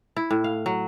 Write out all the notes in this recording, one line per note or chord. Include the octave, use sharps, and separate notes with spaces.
E4
A2
F5
F#3